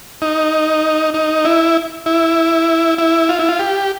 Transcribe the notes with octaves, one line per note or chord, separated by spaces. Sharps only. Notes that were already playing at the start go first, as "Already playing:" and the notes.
D#4
D#4
E4
E4
E4
F4
E4
F4
G4